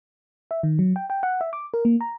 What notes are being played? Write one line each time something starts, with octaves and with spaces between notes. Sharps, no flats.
E5
D#3
F#3
G5
G5
F#5
E5
D6
A#4
A#3
A#5